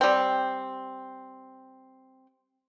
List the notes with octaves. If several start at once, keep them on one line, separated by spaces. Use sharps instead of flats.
G3 C4